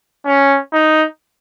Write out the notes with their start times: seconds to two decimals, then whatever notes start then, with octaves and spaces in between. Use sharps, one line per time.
0.26 C#4
0.73 D#4